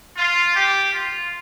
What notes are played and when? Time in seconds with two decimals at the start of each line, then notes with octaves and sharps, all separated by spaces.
0.17 F4
0.55 G4
0.94 F4